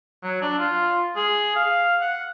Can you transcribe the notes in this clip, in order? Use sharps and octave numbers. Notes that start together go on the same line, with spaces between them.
F#3
D4
F4
G#4
F5
F#5